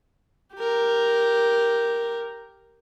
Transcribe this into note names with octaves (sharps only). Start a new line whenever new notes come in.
G4 A#4